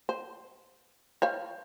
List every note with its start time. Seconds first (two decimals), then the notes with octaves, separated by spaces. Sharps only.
0.09 C5
1.22 C5 C#5 F5